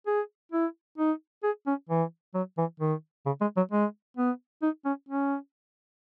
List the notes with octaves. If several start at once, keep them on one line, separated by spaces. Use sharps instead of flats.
G#4
E4
D#4
G#4
C#4
E3
F#3
E3
D#3
C#3
G#3
F#3
G#3
B3
D#4
C#4
C#4